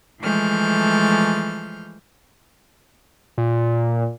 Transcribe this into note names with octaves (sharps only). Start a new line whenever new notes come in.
E3 F3 G#3 A3 F6 G6
A#2